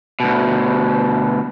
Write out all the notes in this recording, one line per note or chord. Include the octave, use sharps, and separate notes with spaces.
D2 B2